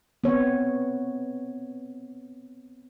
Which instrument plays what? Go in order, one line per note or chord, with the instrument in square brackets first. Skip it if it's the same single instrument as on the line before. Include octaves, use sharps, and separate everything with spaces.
[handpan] B3 C4 C#5